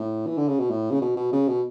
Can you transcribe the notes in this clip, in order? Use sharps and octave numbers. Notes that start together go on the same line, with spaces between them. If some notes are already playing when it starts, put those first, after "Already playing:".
Already playing: A2
E3
D3
C#3
B2
A2
C#3
B2
B2
C#3
B2